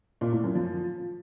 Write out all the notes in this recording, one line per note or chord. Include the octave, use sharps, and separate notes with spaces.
A#2
A2
F#2
F3